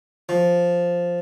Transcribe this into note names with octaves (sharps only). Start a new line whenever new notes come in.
F3